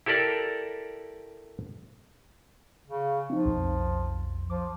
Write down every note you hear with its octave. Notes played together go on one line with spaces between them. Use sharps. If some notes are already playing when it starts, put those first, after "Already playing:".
E4 G4 A4 A#4 D5
C#3
F3 C4 D#4
B1 F2
F3 D6